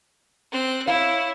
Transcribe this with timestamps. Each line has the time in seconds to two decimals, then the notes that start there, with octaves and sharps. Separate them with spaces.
0.52 C4 F#6
0.87 E4 C#5 F5